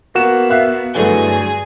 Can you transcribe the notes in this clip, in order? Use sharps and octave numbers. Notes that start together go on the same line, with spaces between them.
A#3 B3 F#4 E7
E5 F5 F#6
G2 D3 E3 F#3 A3 G#4 G#5